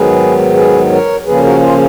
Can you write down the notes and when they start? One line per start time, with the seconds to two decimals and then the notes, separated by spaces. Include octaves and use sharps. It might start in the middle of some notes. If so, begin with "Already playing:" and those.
Already playing: G#2 D#3 F#3 B3 G#4 B4
0.55 G#4 B4
0.91 A#4 C#5
1.26 C#3 F3 A#3 C#4 G#4 B4
1.43 F#4 A#4
1.62 F4 G#4